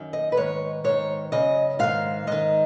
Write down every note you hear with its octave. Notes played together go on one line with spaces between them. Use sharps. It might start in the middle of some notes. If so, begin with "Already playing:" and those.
Already playing: F#2 D#3
D#5
B4
G#2 D#3 C#5
G#2 D#3 C#5
F#2 C#3 D#5
G#2 D#3 F5
G#2 D#3 D#5